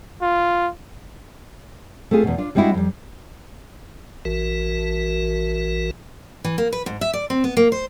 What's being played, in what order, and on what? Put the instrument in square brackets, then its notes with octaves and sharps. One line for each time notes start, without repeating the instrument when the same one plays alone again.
[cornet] F4
[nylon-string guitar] A3 C4 F4 G#4
E2 B2
D4 F4
G3 G#3 C4 D4 E4 F#4
F2 G3
[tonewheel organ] A1 E3 F#4 A#4
[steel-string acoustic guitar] E3
A#3
B4
G#2
E5
D5
C4
B3
A#3
C5